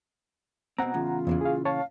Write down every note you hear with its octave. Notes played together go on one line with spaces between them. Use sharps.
B2 C4 F#5 A#5
E2 A2 C#3 F4
E2 A#2 C#3 E3
G#4 F5
C#5 F5 A5